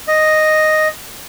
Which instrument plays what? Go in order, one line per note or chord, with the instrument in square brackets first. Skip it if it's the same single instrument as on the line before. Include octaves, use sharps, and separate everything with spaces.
[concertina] D#5